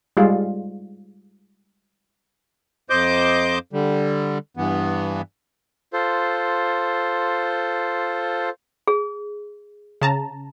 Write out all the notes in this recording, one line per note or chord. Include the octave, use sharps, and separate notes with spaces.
G3 G#3 F4
F2 C5 D#5 D6 G6
D3 G3
G2 E3 B3
F4 A4 C5
G#4
C#3 A5 A#5